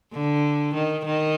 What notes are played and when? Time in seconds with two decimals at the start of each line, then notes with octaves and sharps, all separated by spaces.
0.13 D3
0.74 D#3
1.05 D#3